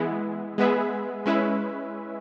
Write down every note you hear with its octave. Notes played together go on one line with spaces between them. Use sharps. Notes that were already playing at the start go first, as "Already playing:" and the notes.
Already playing: E3 G#3 B3 E4
G#3 B3 G#4 B4 E5
G#3 C#4 E4 B4 E5